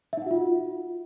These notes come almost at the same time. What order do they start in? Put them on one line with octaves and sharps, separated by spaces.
E5 D#4 F#5 F#4 F4